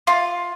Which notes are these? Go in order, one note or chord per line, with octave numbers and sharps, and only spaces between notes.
F4